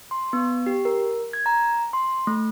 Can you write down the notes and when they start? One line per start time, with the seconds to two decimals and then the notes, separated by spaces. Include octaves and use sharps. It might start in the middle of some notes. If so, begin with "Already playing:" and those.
0.11 C6
0.33 B3
0.66 G4
0.85 A#4
1.33 G#6
1.46 A#5
1.93 C6
2.27 A3